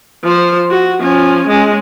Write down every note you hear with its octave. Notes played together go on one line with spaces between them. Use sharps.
F3 C5
F#4
F3 C#4
G#3 C#4